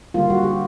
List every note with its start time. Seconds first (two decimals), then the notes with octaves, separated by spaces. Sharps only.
0.14 D3 G3 A#3 F4
0.30 F#4
0.43 G4